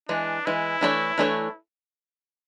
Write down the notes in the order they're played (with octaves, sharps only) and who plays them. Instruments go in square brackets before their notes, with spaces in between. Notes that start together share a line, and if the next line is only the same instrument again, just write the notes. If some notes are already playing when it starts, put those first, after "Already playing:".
[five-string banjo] E3 G#3 [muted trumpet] D4
[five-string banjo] E3 G#3 [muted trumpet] E4
[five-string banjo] E3 A3 D4 A4 C#5
E3 A3 D4 A4 C#5